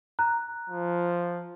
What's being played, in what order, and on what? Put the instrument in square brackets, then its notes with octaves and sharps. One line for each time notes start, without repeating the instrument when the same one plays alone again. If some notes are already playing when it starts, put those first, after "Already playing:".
[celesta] A#5 F#6
[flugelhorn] F3